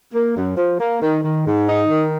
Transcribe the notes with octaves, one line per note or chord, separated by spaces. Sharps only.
A#3
F#2
F3
A#3
D#3
D#3
G#2
D#4
D#3